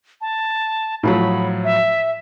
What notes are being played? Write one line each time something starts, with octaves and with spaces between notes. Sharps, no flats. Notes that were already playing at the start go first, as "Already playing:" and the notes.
A5
A2 F3 F#3 B5
E5